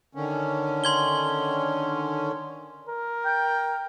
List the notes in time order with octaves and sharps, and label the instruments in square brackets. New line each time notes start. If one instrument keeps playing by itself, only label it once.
[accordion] D3 D#3 C#4
[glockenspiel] C6 G#6 G7
[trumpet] A#4
[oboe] G5